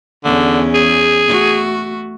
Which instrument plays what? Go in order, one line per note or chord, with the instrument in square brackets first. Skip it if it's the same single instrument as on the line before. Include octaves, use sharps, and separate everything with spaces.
[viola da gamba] E2 C#4 [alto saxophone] D3
[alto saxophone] G#4
[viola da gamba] A3 F#4